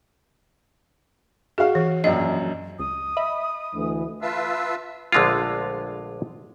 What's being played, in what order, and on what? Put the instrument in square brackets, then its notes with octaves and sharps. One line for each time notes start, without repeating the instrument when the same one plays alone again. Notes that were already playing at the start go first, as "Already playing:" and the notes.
[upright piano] F#4 F5 [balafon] G#4
[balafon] E3
[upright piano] A#1 F#2 [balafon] D#5
[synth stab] C#2 [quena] D#6
[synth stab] D#5 E5 B5
[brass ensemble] D2 E3
[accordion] F4 B4 E5 F5 A5 E6
[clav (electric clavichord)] A#1 D3 G#3 A3 F4